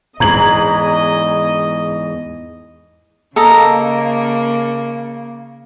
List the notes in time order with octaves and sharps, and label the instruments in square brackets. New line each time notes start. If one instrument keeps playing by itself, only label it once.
[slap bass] E2 G#2 [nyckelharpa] D#5 [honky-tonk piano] A#5 G#6 F#7
[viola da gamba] C#3 A#3 [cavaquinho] A4 D#5 A#5